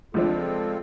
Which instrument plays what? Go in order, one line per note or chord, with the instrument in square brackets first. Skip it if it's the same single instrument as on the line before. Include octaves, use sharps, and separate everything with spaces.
[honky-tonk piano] C#2 F3 D4 [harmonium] C4 F4 A4